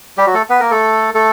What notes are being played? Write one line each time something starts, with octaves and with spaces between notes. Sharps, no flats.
G3 G4
F#3 F#4
A3 A4
B3 B4
A#3 A#4
A3 A4
A3 A4